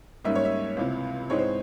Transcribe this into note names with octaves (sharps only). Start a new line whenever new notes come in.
G#2 G3 A#3 C#4 E5
C#5
E5
C#2 C3 E3
G#2 E3 G#3 C4 C#5
C5